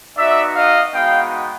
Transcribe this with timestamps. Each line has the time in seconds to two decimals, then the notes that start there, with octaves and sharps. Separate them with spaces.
0.16 B3 D#4 F#4 D5 E5
0.55 D#5 F5
0.94 G#3 B3 D#4 F#4 F5 G5